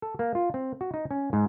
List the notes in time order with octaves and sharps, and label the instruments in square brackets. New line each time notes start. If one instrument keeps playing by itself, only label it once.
[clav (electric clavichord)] A4
A#3
F4
C4
F#4
D#4
C#4
G#2